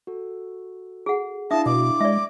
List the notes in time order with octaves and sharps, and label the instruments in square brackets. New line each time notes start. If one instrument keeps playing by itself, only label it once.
[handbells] F#4 A4
[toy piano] G#4 F#5
[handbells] D4 E4 F5 [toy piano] E5 D#6 [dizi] A5
[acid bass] B2 [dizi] D6
[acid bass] G#3 [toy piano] D5 E5